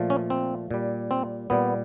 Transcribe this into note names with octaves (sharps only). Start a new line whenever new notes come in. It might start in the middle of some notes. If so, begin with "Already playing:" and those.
Already playing: A#2 F3 A3
C#4
C4
A#2 G3
C4
A#2 G3 B3